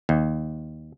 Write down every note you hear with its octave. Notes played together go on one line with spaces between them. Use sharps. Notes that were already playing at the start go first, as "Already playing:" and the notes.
D#2